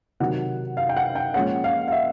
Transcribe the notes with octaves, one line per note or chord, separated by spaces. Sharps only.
C3 D#3 F#3 F#5
F5
G5
F#5
G5
A#2 F3 G#3 C#4 F#5
F5
F5
E5